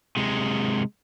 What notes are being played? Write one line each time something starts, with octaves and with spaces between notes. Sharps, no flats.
C3 G#3